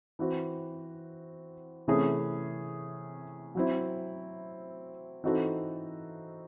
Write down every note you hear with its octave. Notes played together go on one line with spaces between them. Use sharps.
E3 C4 F#4
C3 E3 A3 C#4 G#4
F#3 C4 E4
E3 C4 D#4 F#4 A4